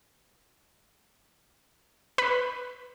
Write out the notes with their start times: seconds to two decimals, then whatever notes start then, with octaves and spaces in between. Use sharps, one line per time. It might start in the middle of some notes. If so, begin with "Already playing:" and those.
2.18 B4